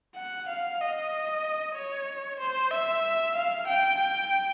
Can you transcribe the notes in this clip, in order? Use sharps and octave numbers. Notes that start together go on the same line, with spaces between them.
F#5
F5
D#5
C#5
C5
E5
F5
G5
G5